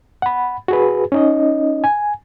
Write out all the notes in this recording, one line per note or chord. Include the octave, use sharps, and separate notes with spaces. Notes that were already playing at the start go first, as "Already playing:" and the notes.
F#5 B5
F#4 G#4 B4
C#4 D#4 D#5
G#5